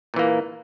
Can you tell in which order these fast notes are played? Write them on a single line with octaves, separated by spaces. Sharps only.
A#2 E3 A#3